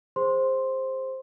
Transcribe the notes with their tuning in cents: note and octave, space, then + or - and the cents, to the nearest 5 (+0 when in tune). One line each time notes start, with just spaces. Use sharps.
G#4 -25 C5 +5 C6 +0